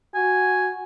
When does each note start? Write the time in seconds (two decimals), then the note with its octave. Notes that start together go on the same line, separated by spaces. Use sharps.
0.15 F#4 G#5